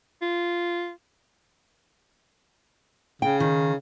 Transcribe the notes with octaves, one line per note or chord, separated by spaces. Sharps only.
F4
C#3 G5
D#3